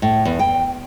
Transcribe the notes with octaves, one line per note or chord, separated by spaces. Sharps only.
A2
E2
G5